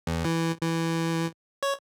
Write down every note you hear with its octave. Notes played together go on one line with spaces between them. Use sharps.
E2
E3
E3
C#5